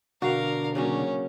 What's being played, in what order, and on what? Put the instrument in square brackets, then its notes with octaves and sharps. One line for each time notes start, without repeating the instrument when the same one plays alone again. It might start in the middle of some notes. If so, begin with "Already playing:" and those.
[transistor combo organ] B2 D3 D4 [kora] F#4 [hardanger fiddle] A#4 F5
[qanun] C#3 F#3 A#3 [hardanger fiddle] C#4